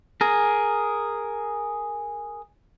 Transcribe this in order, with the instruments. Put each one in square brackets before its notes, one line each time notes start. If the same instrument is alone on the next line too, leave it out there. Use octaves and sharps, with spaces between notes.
[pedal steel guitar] G#4 A#4